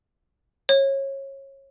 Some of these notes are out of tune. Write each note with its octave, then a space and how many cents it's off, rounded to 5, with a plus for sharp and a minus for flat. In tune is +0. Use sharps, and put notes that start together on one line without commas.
C#5 -25